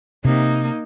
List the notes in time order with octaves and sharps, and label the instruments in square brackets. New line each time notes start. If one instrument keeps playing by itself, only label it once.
[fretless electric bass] C3 [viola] A#3 D#4